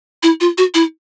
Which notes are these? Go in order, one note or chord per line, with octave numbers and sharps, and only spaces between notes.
E4
F4
F#4
E4